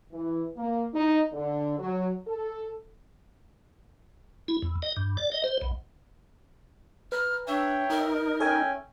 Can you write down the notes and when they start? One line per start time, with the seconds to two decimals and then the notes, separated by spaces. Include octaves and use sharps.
0.12 E3
0.57 A#3
0.94 D#4
1.32 D3
1.78 F#3
2.26 A4
4.48 E4
4.62 E2
4.82 D#5
4.97 G2
5.17 D5
5.32 D#5
5.44 C5
5.61 B1
7.12 B4 A#5 F6
7.48 D4 C#5 E5 G5
7.90 D#4 A#4
8.40 C#4 A4 C#5 E5 G5 G#5